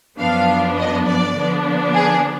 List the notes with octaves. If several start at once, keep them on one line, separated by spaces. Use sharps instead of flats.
F#2 F3 B3 D4 F5
D#5
D5
D3 F3 B3 D4
G#4